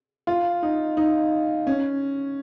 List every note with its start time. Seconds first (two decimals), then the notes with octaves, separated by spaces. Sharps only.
0.27 F4
0.63 D#4
0.97 D#4
1.67 C#4